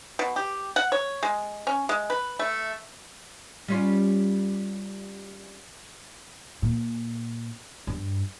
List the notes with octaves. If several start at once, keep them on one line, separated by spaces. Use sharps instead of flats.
B2
G4
F#5
C#5
G#3
C#4
G#3
B4
A3
G3 C#4 F4
A#2
G2